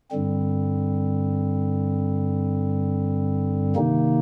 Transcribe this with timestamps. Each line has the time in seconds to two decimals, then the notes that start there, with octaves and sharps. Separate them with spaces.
0.11 G2 D3 G3 C4
3.76 C3 D#3 A#3 D#4